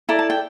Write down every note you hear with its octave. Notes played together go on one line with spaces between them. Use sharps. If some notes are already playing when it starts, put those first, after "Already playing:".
E4 A4 D5 A#5
A5
G5